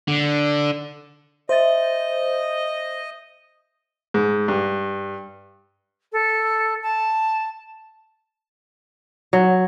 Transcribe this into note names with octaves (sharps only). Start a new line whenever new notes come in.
D3
C5 D#5 E5 A6
G#2
G2
A4
A5
F#3